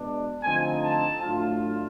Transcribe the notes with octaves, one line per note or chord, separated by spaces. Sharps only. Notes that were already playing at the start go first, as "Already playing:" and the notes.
Already playing: B2 G#3 B3 D4
D3 F3 A3 C4 D#4 G#5
A5
A2 F#3 A3 D4 F4